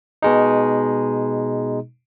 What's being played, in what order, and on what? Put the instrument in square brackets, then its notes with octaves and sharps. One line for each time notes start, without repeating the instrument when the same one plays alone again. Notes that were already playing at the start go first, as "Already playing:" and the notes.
[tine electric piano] B2 G#3 D#4